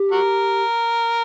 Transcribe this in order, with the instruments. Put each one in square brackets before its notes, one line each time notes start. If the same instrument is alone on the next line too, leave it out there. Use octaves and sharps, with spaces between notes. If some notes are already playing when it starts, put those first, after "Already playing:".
Already playing: [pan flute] G4
[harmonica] F#4 A#4